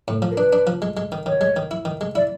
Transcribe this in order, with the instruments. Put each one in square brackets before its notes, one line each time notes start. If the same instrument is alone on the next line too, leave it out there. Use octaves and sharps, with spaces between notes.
[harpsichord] A2
F3
[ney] A#4
[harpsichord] D4 [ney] B4
[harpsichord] D4
F3
G#3
G#3
D#3
[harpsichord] D#3 [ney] C#5
[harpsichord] G#3
D#3
E4
D#3
G#3
[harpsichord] E4 [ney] D5